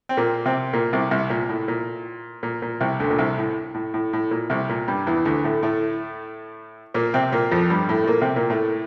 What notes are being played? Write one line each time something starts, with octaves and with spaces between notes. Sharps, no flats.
C4
A#2 A#3
C3 C4
A#2 A#3
C2 C3
C2 C3
A#2
A2
A#2
A#2
A#2
C2 C3
D2 D3
A#2
C2 C3
A2
A2
A2
A2
A#2
C2 C3
A#2
G2 G3
E2 E3
D2 D3
A2 A3
A2 A3
A#2 A#3
C3 C4
A#2 A#3
F2 F3
G2 G3
A2 A3
A3
A#2 A#3
C3 C4
A#2 A#3
A2 A3